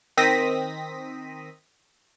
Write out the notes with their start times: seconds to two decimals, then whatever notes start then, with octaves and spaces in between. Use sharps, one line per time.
0.17 D#3 C4 D#6 A#6 B6 D#7